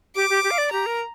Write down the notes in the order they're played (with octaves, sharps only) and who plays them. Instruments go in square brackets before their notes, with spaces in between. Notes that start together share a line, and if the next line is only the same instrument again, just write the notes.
[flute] G4 [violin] D6
[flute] G4
G4
F5
D5
[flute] G4 [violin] A#5
[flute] A#4